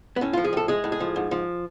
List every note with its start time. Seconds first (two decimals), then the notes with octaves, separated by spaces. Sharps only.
0.16 B3
0.21 A2 C#4
0.33 F3 F4
0.44 G#4
0.53 A2 A4
0.68 G#3 G#4
0.84 A2
0.92 G#4
1.00 F3
1.16 G#2
1.31 F3